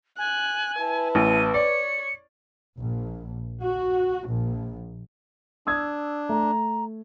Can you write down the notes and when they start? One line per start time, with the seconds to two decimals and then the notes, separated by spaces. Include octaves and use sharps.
0.18 G#5 F#6
0.78 E4 B4 A5
1.15 A1 D#7
1.54 C#5 D5 C#7
2.79 A#1
3.63 F#4
4.30 A#1
5.67 D4 D#6 E6 G#6
6.29 A3 A#5